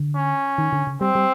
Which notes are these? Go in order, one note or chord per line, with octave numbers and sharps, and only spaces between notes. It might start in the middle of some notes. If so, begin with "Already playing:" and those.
Already playing: D3
C#4
D#3
D3
C#3
G3 C4
G3